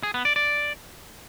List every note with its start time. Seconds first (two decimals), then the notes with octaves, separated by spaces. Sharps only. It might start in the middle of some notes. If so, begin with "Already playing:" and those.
0.03 G#4
0.14 B3
0.25 D5
0.36 D5